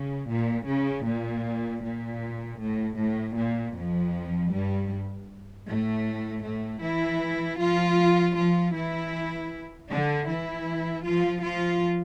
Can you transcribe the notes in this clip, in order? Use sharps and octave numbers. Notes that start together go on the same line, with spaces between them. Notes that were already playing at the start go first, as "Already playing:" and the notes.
Already playing: C#3
A#2
C#3
A#2
A#2
A2
A2
A#2
F2 F3
G2 G3
A2 A3
A2 A3
E3 E4
F3 F4
F3 F4
E3 E4
D3 D4
E3 E4
F3 F4
F3 F4